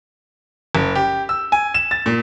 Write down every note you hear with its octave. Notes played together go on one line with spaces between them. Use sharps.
F#1
G4
E6
G#5
E7
A6
A#2